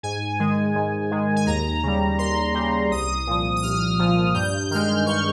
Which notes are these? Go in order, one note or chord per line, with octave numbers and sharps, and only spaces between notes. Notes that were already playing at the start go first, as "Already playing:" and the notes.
G#2 G#5
D#3 G#3
G#2
D#3 G#3
G#5
D#2 A#5
C#3 G3
D#2 C6
C#3 G3
C2 D#6
A#2 F3
D#6
C2 F6
A#2 F3
G2 G6
D#3 G#3 F6
G2 C#6